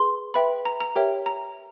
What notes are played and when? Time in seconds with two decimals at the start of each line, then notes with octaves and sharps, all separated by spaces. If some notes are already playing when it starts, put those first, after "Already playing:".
Already playing: G#4 B4 C6
0.34 B4 E5 G5 B5
0.65 A#5
0.80 A#5
0.96 G4 A#4 C#5 E5 G5
1.26 A#5